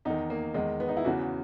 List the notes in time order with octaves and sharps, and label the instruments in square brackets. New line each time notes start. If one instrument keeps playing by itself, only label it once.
[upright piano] E2 D#3 D#4
A#3
E2 D#3 G#3
B3
D#4
E4
E2 C#3 E3 F#4